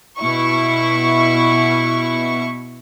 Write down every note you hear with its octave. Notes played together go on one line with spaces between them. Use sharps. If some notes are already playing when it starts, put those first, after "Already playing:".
B2 E4 C#6